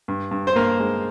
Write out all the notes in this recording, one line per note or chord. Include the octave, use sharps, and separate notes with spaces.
G2
G2
C5
G2 A#3 A#4
G#3